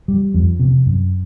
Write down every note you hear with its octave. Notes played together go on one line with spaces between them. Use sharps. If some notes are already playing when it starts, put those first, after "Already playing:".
G3
F2
C3
F#2